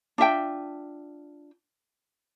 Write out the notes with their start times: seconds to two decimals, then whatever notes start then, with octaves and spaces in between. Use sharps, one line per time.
0.18 D4 F4 E5 G5